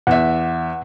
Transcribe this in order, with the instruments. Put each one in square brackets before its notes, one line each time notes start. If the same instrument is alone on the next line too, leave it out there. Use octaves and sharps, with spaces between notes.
[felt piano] E2 E5 [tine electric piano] F#5